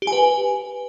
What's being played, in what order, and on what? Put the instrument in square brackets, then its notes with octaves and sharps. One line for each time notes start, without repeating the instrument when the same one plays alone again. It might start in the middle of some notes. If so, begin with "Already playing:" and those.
[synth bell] G4
G#5
B4